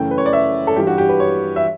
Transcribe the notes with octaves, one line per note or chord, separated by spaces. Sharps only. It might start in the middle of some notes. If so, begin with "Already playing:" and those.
Already playing: F#2 C#3 E3 A3 G5
B4
C#5
D5
E5
A4
G2 E3 G3 G4
F#4
G4
B4
C#5
E5